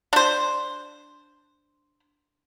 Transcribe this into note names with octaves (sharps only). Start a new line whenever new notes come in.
D4 C5